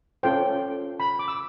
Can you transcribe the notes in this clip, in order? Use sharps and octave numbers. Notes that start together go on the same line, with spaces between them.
C#4 F4 A4 C5 G5
B5
D6
E6